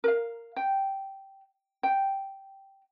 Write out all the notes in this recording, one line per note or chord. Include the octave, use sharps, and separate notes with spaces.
A#4 F5
G5
G5